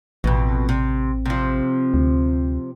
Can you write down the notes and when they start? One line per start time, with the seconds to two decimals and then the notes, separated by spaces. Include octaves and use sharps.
0.24 A1 F2 B2
0.69 C3
1.26 C3 F3
1.94 D2